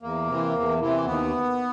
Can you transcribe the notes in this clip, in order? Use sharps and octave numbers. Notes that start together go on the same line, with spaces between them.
E2 A#3
C3 E3
E2
C3 E3
D#2 B3